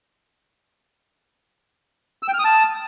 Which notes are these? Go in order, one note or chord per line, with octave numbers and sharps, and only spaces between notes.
E6
G5
F6
D#6
A5